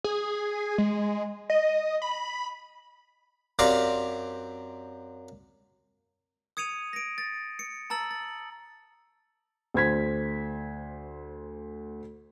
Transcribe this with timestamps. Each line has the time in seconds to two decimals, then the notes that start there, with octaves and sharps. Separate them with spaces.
0.04 G#4
0.78 G#3
1.50 D#5
2.02 B5
3.59 F#2 C4 G4 D5 F5 A#5
6.57 D#6 G#6 C#7 D#7 F7
6.93 A#6 D7
7.18 A6
7.59 C#7
7.90 A5 A#5 E6 A6 F#7
8.11 A6
9.74 D2 C5 G#6 B6